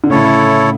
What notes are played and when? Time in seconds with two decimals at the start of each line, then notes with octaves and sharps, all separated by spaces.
0.04 D3
0.10 A2 C#3 E4 A4 C#5